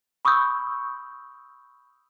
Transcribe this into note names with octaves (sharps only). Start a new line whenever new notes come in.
B5 C#6 D#6 E6 G6